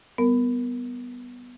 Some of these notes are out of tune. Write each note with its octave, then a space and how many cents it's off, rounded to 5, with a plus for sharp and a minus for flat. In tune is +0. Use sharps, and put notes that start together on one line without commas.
G3 +0 B3 +0 A#4 +0